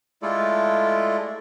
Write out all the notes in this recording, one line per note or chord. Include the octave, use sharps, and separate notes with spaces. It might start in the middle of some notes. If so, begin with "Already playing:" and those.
G#3 A3 E4 F4 A4 D5